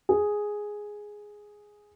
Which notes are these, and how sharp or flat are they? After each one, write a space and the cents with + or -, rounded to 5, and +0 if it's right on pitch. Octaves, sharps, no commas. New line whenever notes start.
G#4 +0